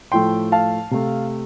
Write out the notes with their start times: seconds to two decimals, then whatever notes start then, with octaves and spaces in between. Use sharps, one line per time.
0.12 A2 F3 A3 G5 C6
0.52 F5 A5
0.91 C3 A3